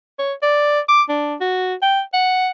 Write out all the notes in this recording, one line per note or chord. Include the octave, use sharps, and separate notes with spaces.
C#5
D5
D6
D4
F#4
G5
F#5